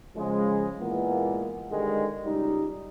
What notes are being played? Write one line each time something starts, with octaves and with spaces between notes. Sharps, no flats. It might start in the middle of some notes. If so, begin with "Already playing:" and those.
C#3 F3 G#3
A#2 E3 G#3 A#3 B3
G#2 D3 D#3 G3 G#3
C#2 G3 D#4